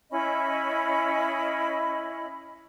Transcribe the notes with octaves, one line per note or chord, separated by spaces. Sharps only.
C#4 E4 D#5 B5